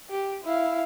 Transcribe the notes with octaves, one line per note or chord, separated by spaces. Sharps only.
G4
E4 F5